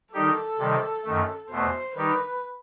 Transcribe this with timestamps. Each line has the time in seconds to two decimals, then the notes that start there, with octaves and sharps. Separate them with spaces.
0.13 D#3 G3 D#4 G4 A4
0.59 C3 D#3 G3
1.05 F#2 D#3 A3
1.50 E2 B2 A3 C5
1.95 D#3 G3 D#4 G4 B4